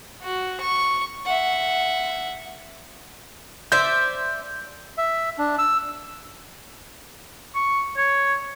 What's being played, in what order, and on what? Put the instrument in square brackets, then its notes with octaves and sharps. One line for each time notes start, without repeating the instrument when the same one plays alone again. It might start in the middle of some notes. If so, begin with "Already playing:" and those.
[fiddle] F#4
C#6
E5 F#5
[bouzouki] C5 D5 E5 [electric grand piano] G6
[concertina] E5
D4
E6
[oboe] C#6
C#5